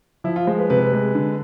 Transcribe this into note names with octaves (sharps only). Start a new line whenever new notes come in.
F3 E4
F4
G#3 C5
B4
C3 B4
G#3
D3